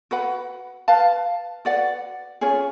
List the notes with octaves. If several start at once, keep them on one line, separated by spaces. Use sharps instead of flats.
F#4 B4 F#5 B5
B4 F5 A5
F#4 B4 D5 F#5
C#4 F4 G#4 C#5